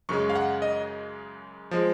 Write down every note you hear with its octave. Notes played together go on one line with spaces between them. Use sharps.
F#2 C#3 G#3 C#6
F5
F#5
D#5
F3 G#3